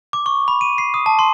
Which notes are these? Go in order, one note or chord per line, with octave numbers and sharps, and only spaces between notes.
D6
C#6
B5
D#7
C7
D#6
A5
C6